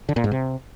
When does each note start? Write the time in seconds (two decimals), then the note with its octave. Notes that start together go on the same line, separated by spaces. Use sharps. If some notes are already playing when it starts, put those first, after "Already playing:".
0.09 D3
0.16 A#2
0.24 G#2
0.31 C3